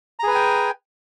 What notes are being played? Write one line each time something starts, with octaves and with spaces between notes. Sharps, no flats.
G#4 B4 G5 G#5 A#5